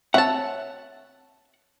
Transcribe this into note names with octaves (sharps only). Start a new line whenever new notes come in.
C4 C#5 E5 F#5 A5